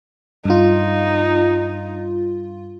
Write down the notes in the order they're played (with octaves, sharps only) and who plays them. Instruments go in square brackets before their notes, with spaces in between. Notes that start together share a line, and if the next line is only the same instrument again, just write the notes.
[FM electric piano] G2 F4 [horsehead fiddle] D#4